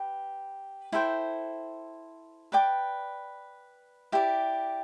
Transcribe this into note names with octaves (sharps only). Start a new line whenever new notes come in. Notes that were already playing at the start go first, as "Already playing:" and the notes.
Already playing: G4 B4
E4 A4 C5 G5
B4 D5 G5 D6
E4 G4 D5